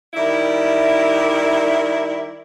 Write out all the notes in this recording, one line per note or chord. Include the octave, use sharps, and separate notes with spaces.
D#3 G3 E4